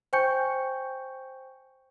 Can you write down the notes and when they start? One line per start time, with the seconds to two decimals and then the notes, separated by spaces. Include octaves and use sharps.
0.13 C5 G5 G#5 C#6 G6 C#7